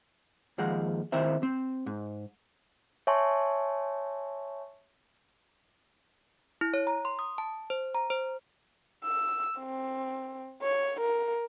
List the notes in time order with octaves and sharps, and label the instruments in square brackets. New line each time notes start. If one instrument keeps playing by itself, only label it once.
[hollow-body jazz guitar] D#2 F3 G#3 F#5
D#3 C4 E4 C5 E5
C4
G#2
[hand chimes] C#5 E5 G#5 A5 C6 C#6
[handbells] E4
C#5
A#5
C6
D#6
A5
C5
A#5
C5
[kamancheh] E6
C4
C#5
A#4